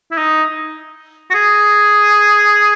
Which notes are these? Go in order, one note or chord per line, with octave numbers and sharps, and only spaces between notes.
E4
D#4
F#4
G#4